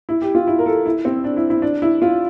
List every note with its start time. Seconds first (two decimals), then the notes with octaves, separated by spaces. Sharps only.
0.09 E4
0.22 G4
0.35 F4
0.47 E4
0.59 A#4
0.66 A4
0.85 E4
1.05 C4
1.24 D4
1.37 E4
1.50 E4
1.62 D4
1.82 E4
2.02 F4